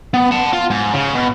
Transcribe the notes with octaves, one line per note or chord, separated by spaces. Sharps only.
B3
F#5 A5
F4
G#2
C#3
B2